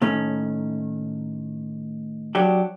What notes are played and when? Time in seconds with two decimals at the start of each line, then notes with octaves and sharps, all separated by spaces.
0.02 A2 D#3 C#4
2.35 F#3 D4 G4